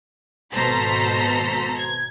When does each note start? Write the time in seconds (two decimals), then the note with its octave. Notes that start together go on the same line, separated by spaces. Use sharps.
0.53 G#1 B2 A4 C5 A#5 B6
1.78 G#6